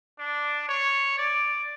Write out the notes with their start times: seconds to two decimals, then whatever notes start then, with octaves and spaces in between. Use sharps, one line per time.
0.19 D4
0.68 C#5
1.18 D5